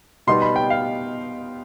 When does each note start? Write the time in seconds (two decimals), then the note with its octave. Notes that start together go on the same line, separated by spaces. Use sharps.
0.27 B2 G3 B3 D#4 C6
0.42 B5
0.56 G5
0.70 F5